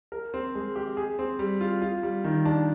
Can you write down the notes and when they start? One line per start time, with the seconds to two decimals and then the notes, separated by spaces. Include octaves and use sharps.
0.12 A#4
0.34 C4
0.55 G#3
0.76 G4
0.97 G#4
1.19 C4
1.39 G3
1.61 F4
1.82 F4
2.03 G3
2.24 D#3
2.45 D4